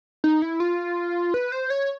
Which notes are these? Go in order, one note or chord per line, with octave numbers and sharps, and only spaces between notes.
D#4
E4
F4
B4
C5
C#5